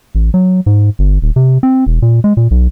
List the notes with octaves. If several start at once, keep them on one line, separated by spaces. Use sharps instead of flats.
A1
F#3
G#2
G1
D#1
C3
C4
E1
A#2
G#3
A#2
B1